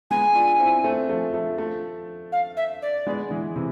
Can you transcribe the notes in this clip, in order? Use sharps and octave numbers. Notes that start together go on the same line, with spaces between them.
G#3 B3 G#5
D4 F4
C4 E4
A3 C4
F3 A3
F3 A3
F3 A3
F5
E5
D5
G#3 B3
E3 G#3
C3 E3